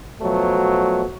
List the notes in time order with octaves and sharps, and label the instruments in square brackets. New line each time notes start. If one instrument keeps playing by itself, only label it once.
[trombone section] B2 F3 F#3 A3